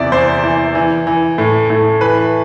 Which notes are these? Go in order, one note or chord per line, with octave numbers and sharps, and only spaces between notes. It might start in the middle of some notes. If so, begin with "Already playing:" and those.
Already playing: E2 C3 D5 E5
E2 C5
E3
E3
E3
A2
A2
E3 B4